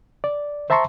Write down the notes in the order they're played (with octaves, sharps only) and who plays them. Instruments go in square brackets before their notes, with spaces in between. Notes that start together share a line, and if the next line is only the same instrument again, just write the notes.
[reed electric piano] D5
C5 E5 A5 A#5 C6 C#6